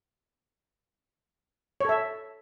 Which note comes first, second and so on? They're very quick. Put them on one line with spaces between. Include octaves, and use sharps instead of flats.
C#5 A4 E5